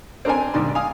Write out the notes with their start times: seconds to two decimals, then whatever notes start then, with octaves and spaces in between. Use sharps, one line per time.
0.25 C4 D4 A#4 C5 G#5
0.54 B1 G2 D#3 D5 C6
0.75 F5 G#5 D#6